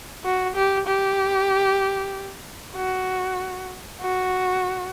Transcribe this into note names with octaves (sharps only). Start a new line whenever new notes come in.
F#4
G4
G4
F#4
F#4